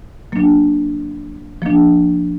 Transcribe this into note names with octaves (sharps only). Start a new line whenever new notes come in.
F#3 A#3 D4
F3 A#3 D4